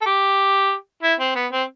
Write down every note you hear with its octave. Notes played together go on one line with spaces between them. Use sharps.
A4
G4
E4
C4
B3
C4